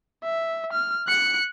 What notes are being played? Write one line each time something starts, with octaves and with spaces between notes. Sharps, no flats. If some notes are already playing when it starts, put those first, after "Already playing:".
E5
F6
F#6 C#7